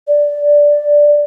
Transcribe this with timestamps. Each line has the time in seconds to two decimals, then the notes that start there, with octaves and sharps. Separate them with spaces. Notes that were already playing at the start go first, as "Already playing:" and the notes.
0.08 D5